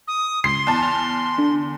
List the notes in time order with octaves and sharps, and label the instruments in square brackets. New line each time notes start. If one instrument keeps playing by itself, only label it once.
[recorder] D#6
[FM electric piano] C#2 [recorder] C6 [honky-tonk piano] C7
[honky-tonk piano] E2 A5
[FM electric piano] F6
D3